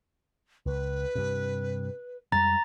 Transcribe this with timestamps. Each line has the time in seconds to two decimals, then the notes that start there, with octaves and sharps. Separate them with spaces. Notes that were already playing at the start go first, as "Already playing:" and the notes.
0.66 C#2 B4
1.16 G2 C3
2.32 F2 G3 G#3 A#5 A6